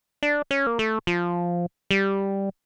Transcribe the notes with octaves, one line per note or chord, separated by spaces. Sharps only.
D4
C#4
A#3
A3
F3
G3